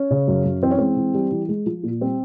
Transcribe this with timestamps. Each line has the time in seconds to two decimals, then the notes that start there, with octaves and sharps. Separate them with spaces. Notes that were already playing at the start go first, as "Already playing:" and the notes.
Already playing: C#4
0.11 C#3
0.28 F#2
0.45 F#2
0.62 E3 C4
0.71 C#4
0.78 G#3 C4
0.97 E3
1.14 G3
1.31 E3
1.49 G#3
1.66 F3
1.83 A#2
2.01 G3 C4